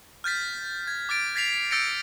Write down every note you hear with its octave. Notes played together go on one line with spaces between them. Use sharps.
F6 G6 A6 B6
G#6
D6 F6 A6 D7
G#6 A6 B6 C7 F7
E6 G6 A6 A#6 C#7 D7